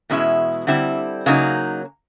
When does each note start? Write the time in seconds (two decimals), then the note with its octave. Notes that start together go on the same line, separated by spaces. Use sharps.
0.10 E2 B2 G#3 C#4 E4
0.67 D3 G3 C4 E4
1.26 C#3 F#3 A#3 D#4